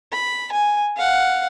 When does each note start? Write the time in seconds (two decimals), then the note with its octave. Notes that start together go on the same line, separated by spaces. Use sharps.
0.13 B5
0.52 G#5
0.97 F5 F#5